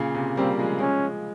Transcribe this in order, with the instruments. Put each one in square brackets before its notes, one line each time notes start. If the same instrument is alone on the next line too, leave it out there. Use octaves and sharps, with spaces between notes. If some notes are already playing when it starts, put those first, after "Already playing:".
Already playing: [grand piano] A#2 C#3
C3
[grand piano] G3 A#3 [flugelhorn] C4
[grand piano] F3 G#3
[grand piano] F3 G#3 [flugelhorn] C#4